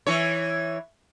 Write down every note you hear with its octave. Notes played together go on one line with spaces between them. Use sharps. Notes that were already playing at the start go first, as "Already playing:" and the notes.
E3 C#5